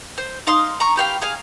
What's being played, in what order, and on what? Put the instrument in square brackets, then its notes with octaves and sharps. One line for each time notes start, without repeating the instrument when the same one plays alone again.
[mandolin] C5
D#4 F5 C6 D#6
A#5 C#6
B3 G4 F5 G5
G#4 F5